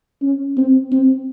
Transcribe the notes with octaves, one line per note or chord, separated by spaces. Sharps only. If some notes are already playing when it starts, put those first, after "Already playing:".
C#4
C4
C4